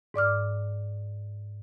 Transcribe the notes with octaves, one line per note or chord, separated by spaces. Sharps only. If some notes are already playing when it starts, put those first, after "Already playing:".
G#2 D5 D6 F6